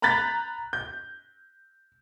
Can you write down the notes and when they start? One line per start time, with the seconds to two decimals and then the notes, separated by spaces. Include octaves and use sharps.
0.02 A#5 B5 F#6 G6 A6 B6
0.73 G6